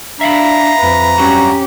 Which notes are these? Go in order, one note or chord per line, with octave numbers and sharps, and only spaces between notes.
D4 E5 F5 A#5 B5
F2 B4
G2 F#3 C#4 F#4 G4